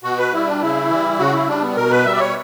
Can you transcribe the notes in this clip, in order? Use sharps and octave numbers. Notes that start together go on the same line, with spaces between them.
B2 F#4
B4
G3 E4
D4
C#3 E4
E3 G3
C#3 F#4
E4
G3 D4
B3
B2 A#4
B4
G3 E5
D5
C#5